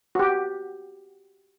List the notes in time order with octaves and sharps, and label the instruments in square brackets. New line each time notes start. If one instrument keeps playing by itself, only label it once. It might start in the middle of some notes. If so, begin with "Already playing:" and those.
[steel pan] F#4 G4